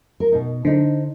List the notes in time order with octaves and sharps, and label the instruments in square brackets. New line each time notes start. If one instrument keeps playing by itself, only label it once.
[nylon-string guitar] A#4
B2 D#4
[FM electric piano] D3 [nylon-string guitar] D4 D#4 C5